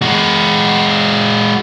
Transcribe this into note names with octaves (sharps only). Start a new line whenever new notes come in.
G#3 F#4